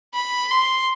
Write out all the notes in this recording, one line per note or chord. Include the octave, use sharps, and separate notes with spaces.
B5
C6